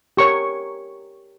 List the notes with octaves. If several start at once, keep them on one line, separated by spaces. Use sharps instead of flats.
G4 A#4 C#5 C#6